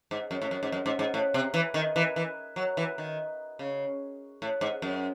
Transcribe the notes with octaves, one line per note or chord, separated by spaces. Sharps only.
G#2
F#2
A2
F#2
G#2
F#2
G#2
G#2
A2
C3
E3
D#3
E3
E3
F#3
E3
D#3
C#3
A2
G#2
F#2